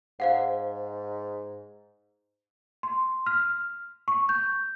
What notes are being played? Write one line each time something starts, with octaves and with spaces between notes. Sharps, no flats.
G#2 C5 F5 F#5
C6
F6
C#6
G6